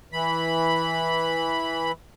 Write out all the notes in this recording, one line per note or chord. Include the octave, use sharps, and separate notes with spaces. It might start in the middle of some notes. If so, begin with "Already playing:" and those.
E3 B5